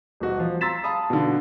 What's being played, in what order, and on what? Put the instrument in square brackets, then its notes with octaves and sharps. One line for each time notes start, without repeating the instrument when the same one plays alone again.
[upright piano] D#1 B2 F#4 D#5
F3
A#5 C6 E6 A6 B6 E7
F5 A5 B5 D#6
B2 D3